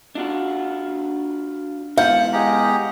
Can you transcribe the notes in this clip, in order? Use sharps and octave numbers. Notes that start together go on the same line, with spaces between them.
D4 F4 F#4
G#2 E3 B3 F5 F#5 G6
G#3 G4 A#5